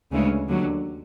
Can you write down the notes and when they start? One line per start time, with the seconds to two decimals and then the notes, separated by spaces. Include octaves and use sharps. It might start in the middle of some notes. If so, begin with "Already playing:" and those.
0.11 D2 C#3 E3 G#3 C#4
0.49 D#2 D3 F#3